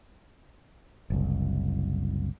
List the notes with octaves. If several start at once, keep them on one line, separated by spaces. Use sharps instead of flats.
F#1 C2